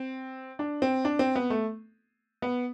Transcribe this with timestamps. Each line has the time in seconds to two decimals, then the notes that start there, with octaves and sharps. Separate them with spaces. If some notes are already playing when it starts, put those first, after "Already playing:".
Already playing: C4
0.59 D4
0.82 C4
1.05 D4
1.19 C4
1.36 B3
1.50 A3
2.42 B3